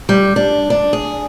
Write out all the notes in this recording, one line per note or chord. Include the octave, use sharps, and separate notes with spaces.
G3
D4
D4
G#4